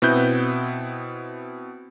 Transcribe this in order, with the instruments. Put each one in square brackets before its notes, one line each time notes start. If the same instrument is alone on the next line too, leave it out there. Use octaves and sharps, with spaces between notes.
[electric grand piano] B2 B3 C4 E4 F#6 G6